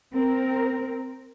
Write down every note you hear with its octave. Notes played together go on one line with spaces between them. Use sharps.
C4 A#4